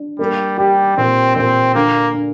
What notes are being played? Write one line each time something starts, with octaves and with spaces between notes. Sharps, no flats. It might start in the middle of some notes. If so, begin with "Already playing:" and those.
Already playing: D4
G3 A#3
G3 G4
A#2 C4
A#2 C4
D3 A#3
D4